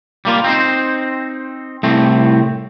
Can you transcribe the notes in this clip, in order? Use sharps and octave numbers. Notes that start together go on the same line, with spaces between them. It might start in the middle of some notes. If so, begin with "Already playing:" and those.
G3 A#3 F4
C4 D#4 C5
C2 A2 A3 C4